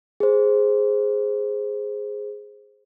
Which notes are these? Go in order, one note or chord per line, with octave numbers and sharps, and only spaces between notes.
G#4 C5